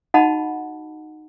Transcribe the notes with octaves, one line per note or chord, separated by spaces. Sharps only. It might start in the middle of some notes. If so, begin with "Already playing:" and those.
D#4 F#4 D#5 F#5 A5 B5